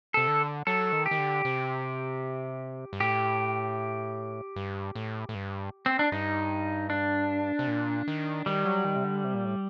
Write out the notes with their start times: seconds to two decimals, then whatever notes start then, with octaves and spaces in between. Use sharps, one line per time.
0.14 C3 A4
0.28 D3
0.67 F#3 A4
0.92 D#3
1.06 G4
1.11 D#3
1.19 D3
1.45 C3
2.93 G2
3.00 A2 G4
4.56 G2
4.95 A2
5.29 A2
5.35 G2
5.86 C4
5.99 D4
6.12 G2 D#4
6.90 D4
7.59 C3
7.68 A#2
8.08 D#3
8.46 D#3 G3
8.65 F#3
8.85 D#3
8.96 C3
9.04 D3
9.24 C3
9.34 A#2
9.45 A2